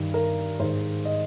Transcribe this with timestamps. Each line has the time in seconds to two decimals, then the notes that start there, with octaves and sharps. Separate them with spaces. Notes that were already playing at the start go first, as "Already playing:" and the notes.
Already playing: G2 D#3
0.14 A#4
0.60 G#2 D#3 C5
1.05 D#5